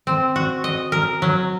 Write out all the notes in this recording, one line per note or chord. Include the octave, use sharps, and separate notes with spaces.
C4
F#4
D#5
A#4
F#3